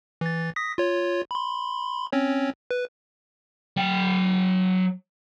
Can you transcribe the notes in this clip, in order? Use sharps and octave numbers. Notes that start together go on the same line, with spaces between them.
E3 A6
D#6 A#6 B6
F4 C#5
B5 C6
C4 C#4 C#5
B4
F#3 G5